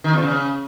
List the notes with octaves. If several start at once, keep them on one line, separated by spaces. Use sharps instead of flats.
D#3
E2
C#3